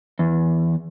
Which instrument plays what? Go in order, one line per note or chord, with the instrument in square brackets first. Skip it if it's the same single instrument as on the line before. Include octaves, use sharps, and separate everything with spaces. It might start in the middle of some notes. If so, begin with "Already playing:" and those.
[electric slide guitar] E2